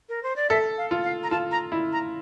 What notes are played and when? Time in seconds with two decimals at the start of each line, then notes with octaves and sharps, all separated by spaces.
0.09 A#4
0.23 C5
0.36 D5
0.50 A4 E5
0.78 F5
0.91 F4
1.04 F5
1.23 A#5
1.31 F4 A5
1.51 A#5
1.72 E4
1.93 A#5